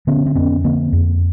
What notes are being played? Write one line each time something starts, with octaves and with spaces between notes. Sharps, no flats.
D3 B3 C#4
C4
F2 B3 C#4
D3 A#3 C4
F2